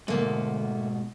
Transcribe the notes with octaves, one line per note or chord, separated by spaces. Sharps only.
G#2 B2 D3 A3 A#3